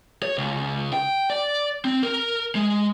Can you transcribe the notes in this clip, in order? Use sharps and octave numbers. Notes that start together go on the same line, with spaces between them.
C#5
C#2
G5
D5
C4
A#4
G#3